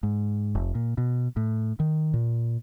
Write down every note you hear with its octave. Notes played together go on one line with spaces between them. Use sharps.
G#2
F1
A#2
B2
A2
D#3
A#2